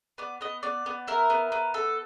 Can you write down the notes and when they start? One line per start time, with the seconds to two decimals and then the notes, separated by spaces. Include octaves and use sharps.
0.18 B3 D5
0.41 B3 D#5
0.63 B3 D5
0.86 B3
1.07 E4 A#4
1.30 B3
1.52 B3
1.74 A4